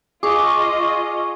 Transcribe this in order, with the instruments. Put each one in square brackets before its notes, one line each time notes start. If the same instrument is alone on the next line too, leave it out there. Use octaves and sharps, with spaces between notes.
[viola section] F4 D#5 [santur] G#4 [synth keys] C#6 D6